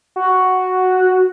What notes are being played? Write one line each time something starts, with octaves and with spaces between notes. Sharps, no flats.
F#4